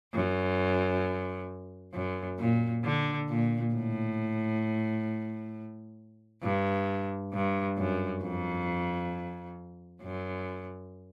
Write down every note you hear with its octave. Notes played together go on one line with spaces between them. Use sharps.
F#2
F#2
A#2
D3
A#2
A2
G2
G2
F#2
F2
F#2